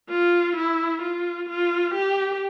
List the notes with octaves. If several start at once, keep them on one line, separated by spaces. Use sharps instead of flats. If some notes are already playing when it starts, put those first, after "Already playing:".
F4
E4
F4
F4
G4